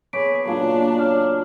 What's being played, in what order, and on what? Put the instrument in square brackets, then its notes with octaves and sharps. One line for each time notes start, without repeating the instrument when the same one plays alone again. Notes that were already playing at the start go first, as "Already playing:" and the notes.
[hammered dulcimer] B3 C#6 D6 [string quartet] G#4 [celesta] C#5 B6 D7
[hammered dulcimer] A#2 C#3 F#3 [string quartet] D4 [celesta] C#5
[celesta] C#5 D6 F6